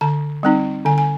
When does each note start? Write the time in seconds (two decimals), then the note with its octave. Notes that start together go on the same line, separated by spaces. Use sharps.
0.01 D3 A5
0.43 G3 C4 D#4
0.85 D3 G#5
0.98 G#5